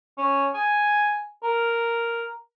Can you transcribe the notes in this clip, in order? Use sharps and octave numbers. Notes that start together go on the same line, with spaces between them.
C#4
G#5
A#4